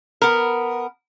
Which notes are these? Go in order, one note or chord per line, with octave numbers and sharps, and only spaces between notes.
B3 A#4